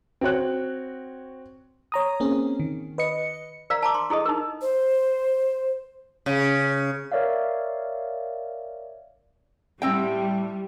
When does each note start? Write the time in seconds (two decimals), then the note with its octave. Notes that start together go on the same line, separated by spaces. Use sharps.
0.21 C4 F#4 C#5 F#6
1.92 C#5 A#5 D#6
2.20 A#3 C4 C#4 G#4
2.60 D#3
2.98 B4 D#5 C#7
3.70 A#4 D5 F5 A#5
3.82 A5 A#5 D6
3.94 C6
4.10 E4 G#4 A4 D#5
4.25 D#4 E4 A#4
4.62 C5
6.26 C#3
7.12 A#4 C#5 D5 E5 F5
9.82 A2 G3 C4 G5